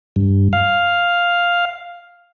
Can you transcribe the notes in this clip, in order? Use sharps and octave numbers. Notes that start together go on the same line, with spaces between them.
G2
F5